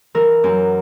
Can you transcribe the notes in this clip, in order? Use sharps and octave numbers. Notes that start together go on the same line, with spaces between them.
E3 A#4
F#2